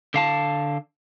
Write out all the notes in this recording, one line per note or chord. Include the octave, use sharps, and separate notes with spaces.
D3 F5 A5